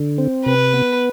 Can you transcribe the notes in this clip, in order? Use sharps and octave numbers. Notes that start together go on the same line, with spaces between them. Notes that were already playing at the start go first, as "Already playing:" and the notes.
Already playing: D3
C4
C3 B4
B3